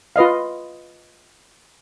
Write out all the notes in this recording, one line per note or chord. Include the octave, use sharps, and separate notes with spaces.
F4 B4 D#5 F5